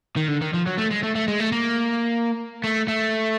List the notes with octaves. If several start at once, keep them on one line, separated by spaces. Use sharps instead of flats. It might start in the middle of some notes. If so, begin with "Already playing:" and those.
D#3
D3
D#3
F3
F#3
A3
G#3
A3
A3
G#3
A3
A#3
A3
A3